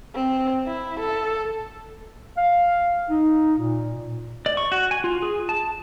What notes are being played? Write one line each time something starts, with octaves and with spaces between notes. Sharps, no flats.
C4
E4
A4
F5
D#4
A#2
D5
C#6
F#4
G#5
F4
G#4
A5